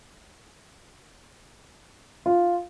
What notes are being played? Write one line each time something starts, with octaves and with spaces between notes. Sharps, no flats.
F4